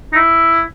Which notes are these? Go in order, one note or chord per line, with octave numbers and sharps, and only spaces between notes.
D#4
E4